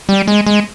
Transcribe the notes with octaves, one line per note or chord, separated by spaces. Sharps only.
G3
G#3
G#3